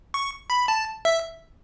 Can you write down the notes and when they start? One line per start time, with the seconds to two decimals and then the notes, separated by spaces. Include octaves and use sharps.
0.14 C#6
0.50 B5
0.68 A5
1.05 E5